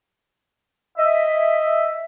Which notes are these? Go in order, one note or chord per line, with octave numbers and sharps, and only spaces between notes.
D#5 E5